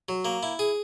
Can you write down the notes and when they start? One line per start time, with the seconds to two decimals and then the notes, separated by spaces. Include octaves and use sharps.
0.09 F#3
0.25 A#3
0.43 E4
0.59 G#4